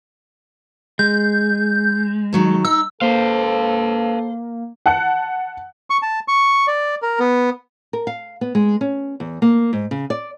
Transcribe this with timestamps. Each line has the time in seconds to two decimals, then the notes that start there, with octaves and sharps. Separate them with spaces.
0.99 G#3 G6
2.33 D#3 F#3 A4
2.65 D#4 E6
3.01 A#3 A4 B4 C5 F5
4.86 F#5 A5 F#6 C#7
5.90 C#6
6.02 A5
6.28 C#6
6.67 D5
7.02 A#4
7.20 B3
7.93 A#4
8.07 F5
8.41 B3
8.55 G#3
8.81 C#4
9.20 E2
9.42 A#3
9.73 G#2
9.91 C#3
10.10 D5